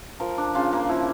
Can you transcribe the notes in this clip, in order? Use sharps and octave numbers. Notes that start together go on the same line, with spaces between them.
F3 A#4
D4
C#3 F4
A#3
F3 E4